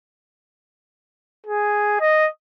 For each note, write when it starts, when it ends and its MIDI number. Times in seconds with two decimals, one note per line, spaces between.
1.47 2.00 68
2.01 2.28 75